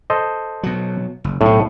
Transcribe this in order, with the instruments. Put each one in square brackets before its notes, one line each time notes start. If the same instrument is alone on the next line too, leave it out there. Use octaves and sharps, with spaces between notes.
[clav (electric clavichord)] A4 C5 D#5
[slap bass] B2 F#3
F#1
[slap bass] B1 C3 [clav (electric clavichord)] A2